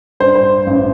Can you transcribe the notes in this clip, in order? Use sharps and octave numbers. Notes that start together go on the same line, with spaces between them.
G2 C5
C5
A1